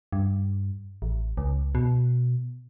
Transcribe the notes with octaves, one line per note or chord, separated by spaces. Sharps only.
G2
A1
C#2
B2